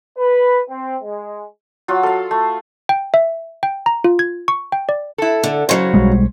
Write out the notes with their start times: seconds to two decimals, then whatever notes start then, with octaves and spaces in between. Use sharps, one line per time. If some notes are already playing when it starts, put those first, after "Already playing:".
0.18 B4
0.69 C4
1.03 G#3
1.88 F#3 F4
2.03 A4 F5
2.31 A3
2.89 G5
3.14 E5
3.63 G5
3.86 A#5
4.04 F4
4.19 G#6
4.48 C#6
4.72 G5
4.89 D5
5.18 E4 A4
5.43 D3
5.69 C#3 F#3 C#4 C5
5.94 B1 G3 G#3